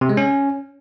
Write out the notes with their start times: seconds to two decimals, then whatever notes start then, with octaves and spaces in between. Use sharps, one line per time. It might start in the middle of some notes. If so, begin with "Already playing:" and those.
0.01 C3
0.09 G#3
0.17 C#4